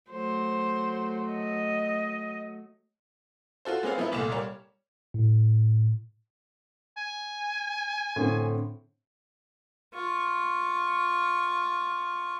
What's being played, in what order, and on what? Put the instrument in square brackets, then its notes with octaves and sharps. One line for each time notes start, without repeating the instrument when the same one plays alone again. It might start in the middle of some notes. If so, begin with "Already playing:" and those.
[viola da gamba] F#3 A3 [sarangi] C5
[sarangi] D#5
[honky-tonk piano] F4 F#4 A4 C5
G#3 B3 C4 C#5 F5
F3 B3 D#4 E4
G1 C2 A#2 A3 E7
G3 A#4 C#5
[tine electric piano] A2
[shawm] G#5
[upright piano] A2 D3 C4
[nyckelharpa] F4 C#6